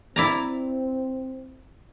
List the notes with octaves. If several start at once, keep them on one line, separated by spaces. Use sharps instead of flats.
C4 E4 D5 A#5